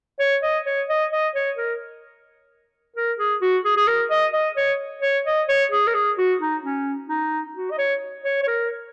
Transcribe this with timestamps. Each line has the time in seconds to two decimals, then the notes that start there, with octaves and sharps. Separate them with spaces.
0.19 C#5
0.43 D#5
0.65 C#5
0.89 D#5
1.12 D#5
1.35 C#5
1.57 A#4
2.96 A#4
3.19 G#4
3.41 F#4
3.65 G#4
3.77 G#4
3.87 A#4
4.10 D#5
4.34 D#5
4.57 C#5
5.02 C#5
5.26 D#5
5.49 C#5
5.72 G#4
5.87 A#4
5.94 G#4
6.18 F#4
6.41 D#4
6.63 C#4
7.09 D#4
7.56 F#4
7.71 D#5
7.78 C#5
8.24 C#5
8.43 C#5
8.47 A#4